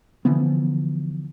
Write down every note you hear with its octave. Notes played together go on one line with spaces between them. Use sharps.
D3 E3 F3 B3